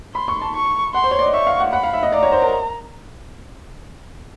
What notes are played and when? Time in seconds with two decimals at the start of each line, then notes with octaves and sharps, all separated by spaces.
0.15 B5 C6
0.28 C#6
0.42 A5
0.55 C#6
0.94 F#5 C6
1.04 C5
1.11 C#5
1.19 D5
1.26 D#5
1.34 E5 C#6
1.47 F5
1.60 F#5
1.73 F#5 B5
1.83 F5
1.93 E5
2.03 D#5
2.12 D5 A#5
2.23 C#5
2.32 C5
2.42 A#4